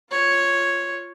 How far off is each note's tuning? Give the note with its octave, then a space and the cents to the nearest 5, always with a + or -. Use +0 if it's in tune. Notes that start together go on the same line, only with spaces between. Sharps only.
F4 +0 C#5 +0